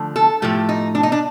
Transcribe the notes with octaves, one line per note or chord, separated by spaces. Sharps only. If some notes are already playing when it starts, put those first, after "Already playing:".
Already playing: D3 F3 A3
A4
A2 F3 A3 G4
D#4
D4
D#4
D4